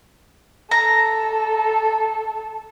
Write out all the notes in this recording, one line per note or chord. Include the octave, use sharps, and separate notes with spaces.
A4 A#5